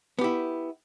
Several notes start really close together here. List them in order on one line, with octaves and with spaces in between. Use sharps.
B3 G4 E4